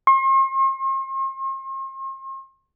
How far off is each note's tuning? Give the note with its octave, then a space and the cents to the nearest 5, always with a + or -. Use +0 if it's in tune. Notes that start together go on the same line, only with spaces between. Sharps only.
C6 +45